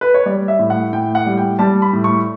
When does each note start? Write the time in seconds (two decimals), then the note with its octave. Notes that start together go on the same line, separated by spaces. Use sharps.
0.01 B4
0.14 C#5
0.26 G3 D5
0.48 E5
0.59 A2
0.70 F#5
0.93 A2 G5
1.15 F#5
1.26 G3
1.37 G5
1.59 G3 A5
1.82 B5
1.93 A2
2.04 C#6